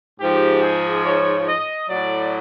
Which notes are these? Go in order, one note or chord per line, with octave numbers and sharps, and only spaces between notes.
G#2 F3 G4
G#4
C#5
D#5
A2 F#3 D5